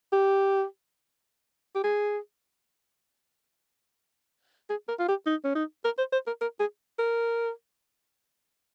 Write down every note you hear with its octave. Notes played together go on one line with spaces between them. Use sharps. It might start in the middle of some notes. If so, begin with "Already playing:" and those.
G4
G4
G#4
G#4
A#4
F4
G4
D#4
C#4
D#4
A#4
C5
C5
A#4
A#4
G#4
A#4